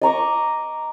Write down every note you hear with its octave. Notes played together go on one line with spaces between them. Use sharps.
D#5 A#5 C#6 D6